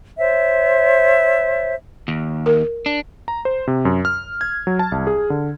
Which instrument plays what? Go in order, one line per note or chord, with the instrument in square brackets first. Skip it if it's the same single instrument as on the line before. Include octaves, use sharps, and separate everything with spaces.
[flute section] C5 C#5 E5
[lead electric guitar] D#2
[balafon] A#4
[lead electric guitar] D4
[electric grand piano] A#5
C5
C3
F#2
F6
G#6
F#3
A5
C2
G#4
D3